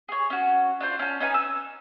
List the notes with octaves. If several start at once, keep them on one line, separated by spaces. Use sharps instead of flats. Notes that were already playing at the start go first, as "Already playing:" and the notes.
G#4 C#5
C#4 F#4
D4 F4 C5
C#4 A5
C#4 D#4 B4 G#5
E6